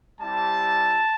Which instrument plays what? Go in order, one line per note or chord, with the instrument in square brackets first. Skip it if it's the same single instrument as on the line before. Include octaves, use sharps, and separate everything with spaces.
[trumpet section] G3 C4 E4 G4 A5